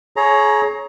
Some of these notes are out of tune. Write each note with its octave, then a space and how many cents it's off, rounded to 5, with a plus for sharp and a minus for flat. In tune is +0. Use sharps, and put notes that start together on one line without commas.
G#4 +30 C#5 +0 A#5 +10